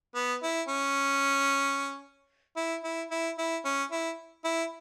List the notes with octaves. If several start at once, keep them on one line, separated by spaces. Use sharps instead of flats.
B3
E4
C#4
E4
E4
E4
E4
C#4
E4
E4